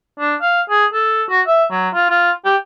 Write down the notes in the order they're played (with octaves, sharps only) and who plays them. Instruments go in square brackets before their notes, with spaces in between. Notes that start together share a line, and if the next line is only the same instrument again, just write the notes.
[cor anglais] D4
F5
G#4
A4
F#4
E5
F#3
F4
F4
G4